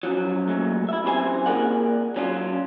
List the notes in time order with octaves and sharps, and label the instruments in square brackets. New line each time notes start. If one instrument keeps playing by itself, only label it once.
[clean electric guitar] F#2 F3 F#3
A#2 F#3 G#3 A3
E4 E5
F#2 C3 E3 F#4 C5 G#5
A#2 G#4 A#4 D5 F#5
F#3 C#4 D4 F4